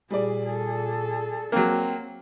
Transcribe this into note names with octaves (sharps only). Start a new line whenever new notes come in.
A#2 G3 G#4 D5
G#4 A4
F#3 A#3 C4